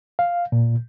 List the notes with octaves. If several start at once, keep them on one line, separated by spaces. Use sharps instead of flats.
F5
A#2